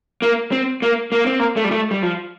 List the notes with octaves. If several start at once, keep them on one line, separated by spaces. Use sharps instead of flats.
A#3
C4
A#3
A#3
C4
A#3
A3
G3
A3
G3
F3